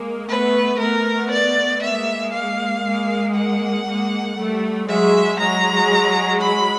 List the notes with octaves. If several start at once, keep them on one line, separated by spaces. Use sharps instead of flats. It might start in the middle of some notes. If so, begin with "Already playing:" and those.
Already playing: G#3 A#3
A3 B3 B4
A3 B3 A#4
D5
G#3 A#3 E5
F5
G#3 A#3
F#5
G#3 A#3
G3 A3
F#3 G#3 E5
F#3 G#3 A#5
B5